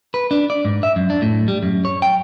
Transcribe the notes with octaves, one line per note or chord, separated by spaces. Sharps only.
B4
D4
D5
G#2
E5
F#2
D4
A2
G3
F#2
C#5
G5